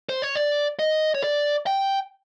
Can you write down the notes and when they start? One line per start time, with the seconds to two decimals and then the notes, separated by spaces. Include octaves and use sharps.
0.09 C5
0.22 C#5
0.35 D5
0.79 D#5
1.15 C#5
1.24 D5
1.67 G5